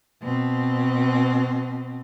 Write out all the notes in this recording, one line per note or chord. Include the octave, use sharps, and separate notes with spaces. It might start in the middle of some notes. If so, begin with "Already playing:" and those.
B2 C4